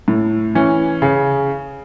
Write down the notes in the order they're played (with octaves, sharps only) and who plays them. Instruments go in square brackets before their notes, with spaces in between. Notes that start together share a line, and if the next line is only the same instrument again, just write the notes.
[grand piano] A2
E3 C#4
C#3